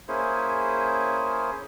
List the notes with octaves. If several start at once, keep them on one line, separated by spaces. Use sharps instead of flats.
A#3 C#4 E4 G#4 C5